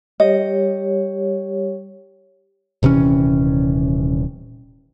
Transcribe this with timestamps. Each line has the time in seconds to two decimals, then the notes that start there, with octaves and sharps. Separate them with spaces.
0.20 G3 G4 C#5 D#5
2.83 D#1 C3 E3 C#4